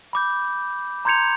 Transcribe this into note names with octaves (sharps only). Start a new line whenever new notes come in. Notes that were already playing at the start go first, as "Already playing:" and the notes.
B5 D6 G6
A#5 C6 G6 G#6 C#7 F7